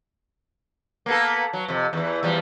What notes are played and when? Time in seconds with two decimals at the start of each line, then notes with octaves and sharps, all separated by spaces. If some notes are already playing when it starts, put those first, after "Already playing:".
1.06 A#3 B3 A4
1.53 F#3
1.68 F2 C3
1.93 E2 E3
2.23 E2 F3 G3